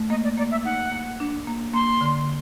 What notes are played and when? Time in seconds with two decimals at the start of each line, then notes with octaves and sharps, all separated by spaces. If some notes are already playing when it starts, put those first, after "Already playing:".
Already playing: A3
0.10 A#3 D#5
0.24 D5
0.38 A#3 D5
0.51 E5
0.65 D#4 F#5
0.92 A#3
1.20 D4
1.47 A#3
1.74 A#3 C6
2.01 D3